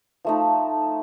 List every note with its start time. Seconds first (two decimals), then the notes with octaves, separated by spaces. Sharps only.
0.25 F3 A3 D#4